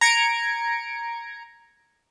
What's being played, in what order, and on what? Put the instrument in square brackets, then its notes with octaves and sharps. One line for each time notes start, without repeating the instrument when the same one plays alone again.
[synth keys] A#5 G#6 C#7 D7